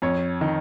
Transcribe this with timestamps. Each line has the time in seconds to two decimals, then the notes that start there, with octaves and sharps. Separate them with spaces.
0.02 F2 C#5
0.41 D#3